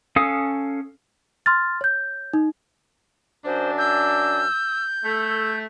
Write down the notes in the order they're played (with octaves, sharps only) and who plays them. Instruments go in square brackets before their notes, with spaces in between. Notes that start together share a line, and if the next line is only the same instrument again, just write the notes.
[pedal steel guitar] C#4 A4 F5 D#6
[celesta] C6 F6 A6
C#5 G6
D#4
[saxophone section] F#2 D4 [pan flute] C5
[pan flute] E6 [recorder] G6
[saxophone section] A3 [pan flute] A4